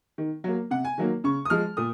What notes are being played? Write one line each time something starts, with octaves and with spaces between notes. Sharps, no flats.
D#3
F#3 A#3
C3 F#5
G#5
D#3 F#3 A#3
C#3 C#6
D#6
F3 G#3 F6
A#2 D#6